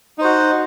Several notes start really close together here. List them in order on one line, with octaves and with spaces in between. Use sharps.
D#4 C5 F#4